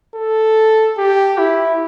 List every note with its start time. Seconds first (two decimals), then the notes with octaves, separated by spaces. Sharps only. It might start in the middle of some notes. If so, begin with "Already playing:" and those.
0.15 A4
0.98 G4
1.38 E4